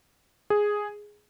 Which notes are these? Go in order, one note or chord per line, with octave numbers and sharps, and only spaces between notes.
G#4